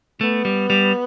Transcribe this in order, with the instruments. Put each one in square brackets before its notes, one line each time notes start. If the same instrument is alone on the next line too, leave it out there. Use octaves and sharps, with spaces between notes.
[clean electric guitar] A3 [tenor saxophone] B3
[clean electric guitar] G3
G3